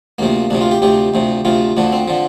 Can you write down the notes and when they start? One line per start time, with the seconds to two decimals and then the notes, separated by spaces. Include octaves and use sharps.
0.18 D2 C3 F3 A#3
0.50 D2 C3 F3 D4
0.61 F4
0.71 G4
0.82 D2 C3 F3 G4
1.14 D2 C3 F3
1.45 D2 C3 F3 F4
1.77 D2 D3 F3 D4
1.92 C4
2.08 D3 F3